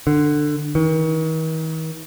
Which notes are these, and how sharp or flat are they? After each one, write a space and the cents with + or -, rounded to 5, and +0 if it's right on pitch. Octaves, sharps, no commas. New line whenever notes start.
D3 +20
D#3 +45